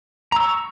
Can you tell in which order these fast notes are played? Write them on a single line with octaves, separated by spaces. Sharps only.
A#5 E6 C#6